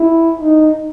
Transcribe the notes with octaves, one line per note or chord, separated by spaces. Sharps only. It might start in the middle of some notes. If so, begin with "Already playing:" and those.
Already playing: E4
D#4